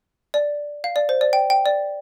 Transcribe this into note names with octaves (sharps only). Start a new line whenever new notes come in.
D5
F5
D5
C5
D5
G5
G5
D5